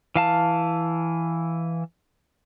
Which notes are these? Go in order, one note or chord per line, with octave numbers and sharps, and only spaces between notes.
E3 F5 A5